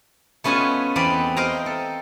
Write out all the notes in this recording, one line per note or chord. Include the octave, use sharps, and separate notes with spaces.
A3 B3 C#4 F4 D#5 G#5
E2 B3 C4 D5 D#5 B5
A#4 C5 D#5 F5 G5 A#5
A4